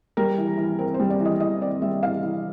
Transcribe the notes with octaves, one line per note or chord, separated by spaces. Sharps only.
G3 A#4
E3
E3
C4 A#4
C5
G3
D5
E3
D#5
E3 D#5
C4 D5
G3 E5
E3 F5
E3